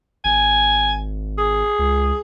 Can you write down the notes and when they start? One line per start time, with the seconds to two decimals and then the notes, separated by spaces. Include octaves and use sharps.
0.25 G#1 G#5
1.38 G#4
1.79 C#2